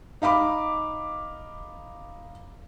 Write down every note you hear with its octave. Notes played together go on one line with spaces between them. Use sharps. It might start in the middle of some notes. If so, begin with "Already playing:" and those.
D#4 F5 B5 D6